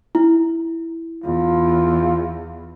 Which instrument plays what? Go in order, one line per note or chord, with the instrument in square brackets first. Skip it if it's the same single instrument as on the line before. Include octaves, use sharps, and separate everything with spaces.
[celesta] E4
[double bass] E2 [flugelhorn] F4